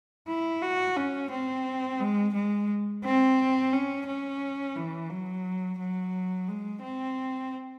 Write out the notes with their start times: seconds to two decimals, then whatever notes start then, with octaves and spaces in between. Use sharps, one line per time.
0.28 E4
0.62 F#4
0.96 C#4
1.31 C4
2.00 G#3
2.34 G#3
3.04 C4
3.72 C#4
4.07 C#4
4.76 E3
5.10 F#3
5.79 F#3
6.48 G#3
6.82 C4